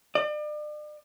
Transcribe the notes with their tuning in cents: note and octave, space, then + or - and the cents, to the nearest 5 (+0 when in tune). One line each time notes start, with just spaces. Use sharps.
D5 +40